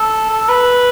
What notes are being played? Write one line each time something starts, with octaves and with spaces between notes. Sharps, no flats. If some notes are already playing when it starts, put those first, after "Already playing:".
Already playing: A4
A4
B4